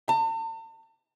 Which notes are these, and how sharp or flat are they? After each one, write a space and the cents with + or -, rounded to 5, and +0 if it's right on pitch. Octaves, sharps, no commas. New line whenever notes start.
A5 +40